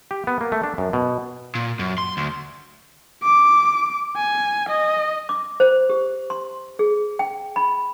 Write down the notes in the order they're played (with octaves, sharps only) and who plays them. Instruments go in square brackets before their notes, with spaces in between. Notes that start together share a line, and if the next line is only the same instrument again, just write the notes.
[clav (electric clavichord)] G4
B3
A#3
A3
D4
F#2
B2
[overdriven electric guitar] A#2
F#2
C6
D2
[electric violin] D6
G#5
D#5
[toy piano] D6
C5
G4
C6
G#4
G5
B5